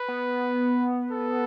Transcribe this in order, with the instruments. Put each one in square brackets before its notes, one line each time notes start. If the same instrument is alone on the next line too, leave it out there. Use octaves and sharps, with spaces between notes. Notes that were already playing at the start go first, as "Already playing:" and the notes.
Already playing: [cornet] B4
[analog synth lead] B3
[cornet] A4